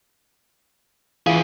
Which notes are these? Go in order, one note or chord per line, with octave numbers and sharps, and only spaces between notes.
E3 F4 G#4 F5